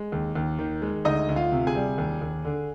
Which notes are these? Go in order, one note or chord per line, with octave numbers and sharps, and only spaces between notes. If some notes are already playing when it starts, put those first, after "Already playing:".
Already playing: G#3
D#2
D#2
D#3
G#3
D2 D#4 D#5
D2
F4 F5
C3
G#4 G#5
G3
D#2
D#2
D3